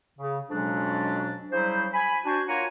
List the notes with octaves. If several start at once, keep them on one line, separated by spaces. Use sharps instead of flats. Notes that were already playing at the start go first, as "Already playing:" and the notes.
C#3
F2 B2 F#3 G#3 C#4 D4
C#3 F#3 G3 E4 C5
G#5 B5
D4 F#4 C5 G#5
A#3 F4 C#5 F#5 G#5 A#5